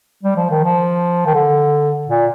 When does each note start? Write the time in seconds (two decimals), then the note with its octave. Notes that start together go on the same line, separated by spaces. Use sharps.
0.23 G3
0.36 F3
0.51 D#3
0.64 F3
1.26 D#3
1.34 D3
2.07 A#2